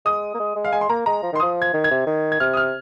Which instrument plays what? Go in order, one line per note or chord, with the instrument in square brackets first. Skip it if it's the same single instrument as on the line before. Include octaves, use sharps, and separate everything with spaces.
[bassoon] G#3 [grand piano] D#6
[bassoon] A#3
G#3
G#3
[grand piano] F5
[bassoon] G#3 [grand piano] G#5
[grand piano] C6
[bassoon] A#3 [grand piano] A#5
[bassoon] G#3 [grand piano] A#5
[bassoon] F3
[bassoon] D#3 [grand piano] C6
[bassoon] F3 [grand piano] D#6
[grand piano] G#6
[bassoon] D#3
[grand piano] G#6
[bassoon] C3
D#3
[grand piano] G#6
[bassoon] C3 [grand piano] F6
[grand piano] D#6
F6